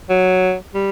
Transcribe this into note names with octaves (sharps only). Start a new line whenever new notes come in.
F#3
G3